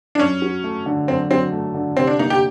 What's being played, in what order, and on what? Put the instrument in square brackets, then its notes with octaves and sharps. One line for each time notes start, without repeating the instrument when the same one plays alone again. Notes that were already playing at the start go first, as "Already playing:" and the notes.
[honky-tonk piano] D4
[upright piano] F#2 [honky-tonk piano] C#4
[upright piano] F#3
A3
D3
[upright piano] F#2 [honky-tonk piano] C4
[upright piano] F#3 [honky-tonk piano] C4
[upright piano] A3
D3
[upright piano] C3 [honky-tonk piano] C4
[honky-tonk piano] D4
[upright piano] A#3 [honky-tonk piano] D#4
[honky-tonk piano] G4